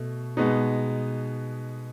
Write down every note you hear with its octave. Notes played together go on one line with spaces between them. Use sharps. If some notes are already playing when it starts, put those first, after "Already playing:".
Already playing: B2 A3
B2 G#3 B3 D#4